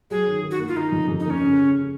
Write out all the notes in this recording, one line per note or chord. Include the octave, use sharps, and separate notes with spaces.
F#3 G#4
D#3
D#3
F#4
A#3
F4
D#3 D#4
F2
F2
D#4
A#3 C#4
C#3
C#3